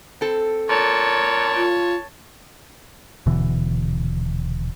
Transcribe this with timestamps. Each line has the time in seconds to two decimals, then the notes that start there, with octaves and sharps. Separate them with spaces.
0.21 C4 A4
0.69 A#2 C#5 A5
1.57 F4
3.26 D#1 B2 D3 E3